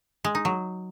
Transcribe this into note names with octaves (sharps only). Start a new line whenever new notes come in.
G#3
D#4
F#3